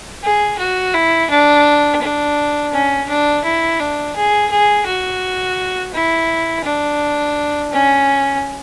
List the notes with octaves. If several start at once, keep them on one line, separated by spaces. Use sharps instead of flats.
G#4
F#4
E4
D4
D4
C#4
D4
E4
D4
G#4
G#4
F#4
E4
D4
C#4